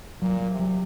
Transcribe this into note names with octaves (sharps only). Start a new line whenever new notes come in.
A#2 F#3
F#3
C3
F#3